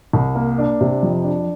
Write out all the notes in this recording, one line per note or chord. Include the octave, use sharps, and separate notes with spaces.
C2
A#3
D4
C3
F2
D4